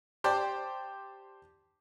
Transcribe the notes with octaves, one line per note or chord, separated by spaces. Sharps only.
G4 C5 D5 G5 A5